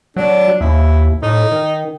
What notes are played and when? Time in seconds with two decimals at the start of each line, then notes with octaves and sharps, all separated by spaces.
0.16 F#3 D4
0.61 D#2 E4
1.22 A2 D#4
1.52 D#3